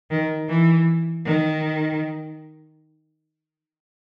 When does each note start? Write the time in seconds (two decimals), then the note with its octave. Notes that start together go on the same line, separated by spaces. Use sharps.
0.11 D#3
0.49 E3
1.26 D#3